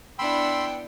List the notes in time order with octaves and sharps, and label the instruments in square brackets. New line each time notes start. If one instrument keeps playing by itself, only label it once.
[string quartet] B3 D4 E4 [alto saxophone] G5 [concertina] B5 C6 E6